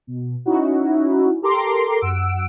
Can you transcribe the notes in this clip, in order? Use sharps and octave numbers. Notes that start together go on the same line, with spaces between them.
B2
C#4 D#4 E4 F#4
G4 A4 A#4 A#5 C6 D6
F#2 F#5 E6 D7